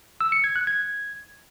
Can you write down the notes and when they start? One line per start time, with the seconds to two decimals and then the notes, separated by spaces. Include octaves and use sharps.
0.21 E6
0.32 C#7
0.44 G#6
0.56 F#6
0.67 G#6